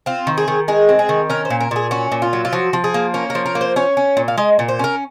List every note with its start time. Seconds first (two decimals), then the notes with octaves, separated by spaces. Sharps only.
0.06 C4 F4
0.27 D#3
0.38 G#4
0.48 D#3
0.68 G#3 G#4
0.89 C4
0.99 G#4
1.09 D#3
1.30 C#4 A#4
1.45 C5
1.50 A#2
1.60 A#4
1.71 A#2 G#4
1.91 C#4 F#4
2.12 A#2
2.22 F4
2.33 F#3
2.45 F4
2.53 F3 F#4
2.73 F3
2.84 G#4
2.94 A#3
3.14 C#4 A#4
3.30 A#4
3.35 F3
3.46 A#4
3.55 A#3
3.61 C5
3.76 C#4 C#5
3.97 C#4
4.17 A#2
4.28 F5
4.38 G#3 D#5
4.59 A#2
4.68 C5
4.79 C#4 A#4